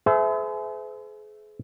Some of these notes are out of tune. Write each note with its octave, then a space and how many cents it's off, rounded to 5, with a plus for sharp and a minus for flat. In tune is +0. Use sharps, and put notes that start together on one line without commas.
G#4 +40 C5 -40 E5 +0